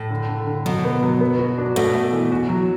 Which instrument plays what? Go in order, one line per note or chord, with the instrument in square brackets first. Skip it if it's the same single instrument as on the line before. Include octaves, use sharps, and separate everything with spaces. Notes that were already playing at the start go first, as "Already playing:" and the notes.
Already playing: [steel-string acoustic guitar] A2
[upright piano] D3
D3
D3
[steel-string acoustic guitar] B2 [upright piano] F#3
[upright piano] B3
F#3
B3
F#4
D4
[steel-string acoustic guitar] B2 [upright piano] A3
[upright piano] A3
E3
F#4
F#3